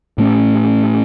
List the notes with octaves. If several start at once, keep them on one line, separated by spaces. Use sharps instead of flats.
A2 A3 C#4